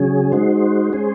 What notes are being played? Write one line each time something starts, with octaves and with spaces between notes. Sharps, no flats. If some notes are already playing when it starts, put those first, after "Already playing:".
Already playing: C#3 F#3 C#4 G#4
G#3 D#4 F#4 C5
G#3 C#4 G#4 C5